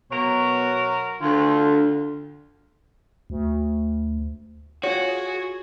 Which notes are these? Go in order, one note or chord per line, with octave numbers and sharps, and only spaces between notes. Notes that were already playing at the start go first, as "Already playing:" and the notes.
B2 F#3 A#4 C#5
D2 D3 F4
D2
F4 F#4 G#4 C#5